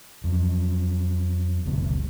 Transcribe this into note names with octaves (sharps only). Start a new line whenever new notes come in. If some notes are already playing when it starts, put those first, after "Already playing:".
F2 F#3
F#1 C#2 B2